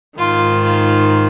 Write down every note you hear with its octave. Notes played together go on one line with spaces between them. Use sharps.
G#2 D#3 F4
F4